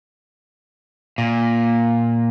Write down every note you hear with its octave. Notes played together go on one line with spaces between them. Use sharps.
A#2